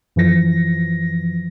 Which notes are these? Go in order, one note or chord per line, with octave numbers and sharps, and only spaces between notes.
F#2 E3 F3 A#6